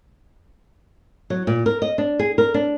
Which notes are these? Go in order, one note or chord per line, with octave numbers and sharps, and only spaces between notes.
F#3
A#2
A#4
D#5
D4
G#4
A#4
D4